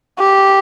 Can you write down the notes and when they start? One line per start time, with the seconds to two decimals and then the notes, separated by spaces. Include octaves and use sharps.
0.19 G4